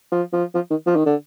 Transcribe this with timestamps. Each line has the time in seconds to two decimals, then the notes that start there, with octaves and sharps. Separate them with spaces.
0.12 F3
0.33 F3
0.54 F3
0.71 D#3
0.87 F3
0.96 D#3
1.06 D3